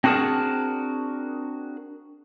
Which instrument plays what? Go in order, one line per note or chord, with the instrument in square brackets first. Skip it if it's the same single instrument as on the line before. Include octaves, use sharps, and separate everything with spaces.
[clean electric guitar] C4 D4 F#4 G#4 A#4 A5